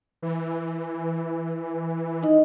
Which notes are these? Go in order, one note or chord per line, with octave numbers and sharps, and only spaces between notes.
E3
D#4 D#5